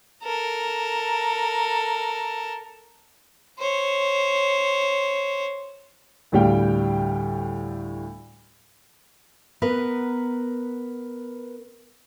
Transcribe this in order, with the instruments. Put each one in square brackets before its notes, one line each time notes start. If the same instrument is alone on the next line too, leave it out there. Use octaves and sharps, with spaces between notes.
[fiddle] A4 A#4
C5 C#5
[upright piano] D2 A2 G3 F5 G5
[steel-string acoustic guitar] B3 A#4 B4